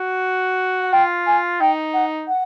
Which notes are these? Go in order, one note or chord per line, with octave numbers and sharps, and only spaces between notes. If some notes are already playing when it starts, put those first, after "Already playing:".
Already playing: F#4
F#5
F4 G5
G#5
D#4 G5
F#5
F#5